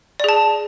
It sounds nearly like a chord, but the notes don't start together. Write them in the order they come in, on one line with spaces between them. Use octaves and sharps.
D5 G#4 A5